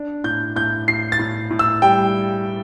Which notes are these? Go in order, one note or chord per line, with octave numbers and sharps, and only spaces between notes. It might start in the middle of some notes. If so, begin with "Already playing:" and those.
Already playing: D4
A2 G6
A2 G6
A2 C7
A6
A2
A2
E6
G3 G5